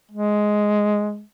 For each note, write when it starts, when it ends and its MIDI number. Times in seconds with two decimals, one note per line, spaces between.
0.11 1.22 56